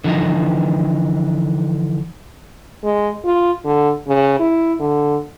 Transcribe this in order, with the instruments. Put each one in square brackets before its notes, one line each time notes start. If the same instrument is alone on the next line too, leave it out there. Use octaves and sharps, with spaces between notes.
[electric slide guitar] D3 E3 F3 D#4
[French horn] G#3
F4
D3
C#3
E4
D3